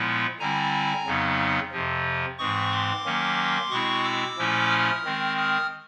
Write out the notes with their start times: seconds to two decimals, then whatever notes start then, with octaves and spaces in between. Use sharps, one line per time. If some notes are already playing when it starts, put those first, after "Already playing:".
Already playing: A#2 F3 G#3 B3 E4
0.40 D3 G3 C4 E4 G#5 A#5
1.06 F2 C#3 F#3 B3 D#4
1.72 F2 C3 F3
2.39 G#2 E3 G#3 C4 C#6 D#6
2.71 C6 D6
3.05 D#3 F#3 A#3 C#4
3.71 B2 G#3 C4 E4 C#6 D#6
4.05 D6 E6
4.37 A#2 F3 A3 C#4 E4
4.71 D#6 F6
5.05 D#3 G#3 C4
5.37 D#6 F6